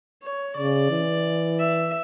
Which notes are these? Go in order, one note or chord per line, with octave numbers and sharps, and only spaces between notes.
C#5
C#3 D5
E3
E5